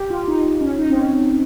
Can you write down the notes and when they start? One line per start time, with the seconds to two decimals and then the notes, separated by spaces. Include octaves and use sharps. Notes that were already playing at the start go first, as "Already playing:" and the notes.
Already playing: G4
0.10 F4
0.28 D#4
0.61 C#4
0.78 D#4
0.90 C4
0.95 C#4